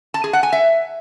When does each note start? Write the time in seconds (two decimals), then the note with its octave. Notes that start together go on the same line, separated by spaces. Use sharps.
0.14 A5
0.24 G#4
0.33 F#5
0.43 G#5
0.53 E5